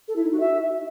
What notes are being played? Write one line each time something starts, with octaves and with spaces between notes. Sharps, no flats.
A4
E4
D#4
F#4
E5